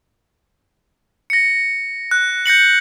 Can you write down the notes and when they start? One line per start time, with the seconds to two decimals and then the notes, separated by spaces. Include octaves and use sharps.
1.30 A#6 C#7
2.11 F#6
2.46 G6 A#6 C#7 F#7